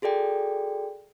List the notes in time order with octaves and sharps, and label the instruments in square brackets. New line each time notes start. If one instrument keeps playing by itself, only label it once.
[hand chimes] F#4 G#4 A4 D5 G5